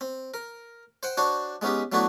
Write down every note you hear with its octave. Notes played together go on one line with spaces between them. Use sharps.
C4
A#4
C5 F#5 G5
D4 F#4 C5 C#5
G#3 B3 C#4 D#4 G4
F#3 A3 B3 D4 E4 F#4